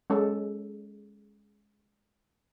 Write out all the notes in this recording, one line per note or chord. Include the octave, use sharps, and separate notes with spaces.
G#3 C#4 A4